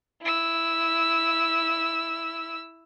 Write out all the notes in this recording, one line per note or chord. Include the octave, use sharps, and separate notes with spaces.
E4 E6